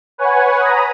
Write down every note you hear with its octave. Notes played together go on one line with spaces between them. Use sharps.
B4 C#5 F#5 G#5
A#5 B5 D#6